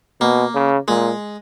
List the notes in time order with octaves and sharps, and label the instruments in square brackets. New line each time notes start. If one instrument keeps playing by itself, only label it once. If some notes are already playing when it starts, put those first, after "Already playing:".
[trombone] B2 [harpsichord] A#3
[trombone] C#3
[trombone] A#2 [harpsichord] G#3